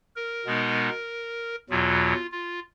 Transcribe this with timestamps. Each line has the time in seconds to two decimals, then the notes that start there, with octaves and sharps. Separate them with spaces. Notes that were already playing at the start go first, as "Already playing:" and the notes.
0.16 A#4
0.46 B2 G#3 B3 D#4
1.70 E2 B2 F#3 F4
2.32 F4